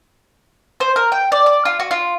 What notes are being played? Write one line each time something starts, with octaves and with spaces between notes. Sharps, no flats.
C5
A#4
G5
D5
D5
F4
F#4
F4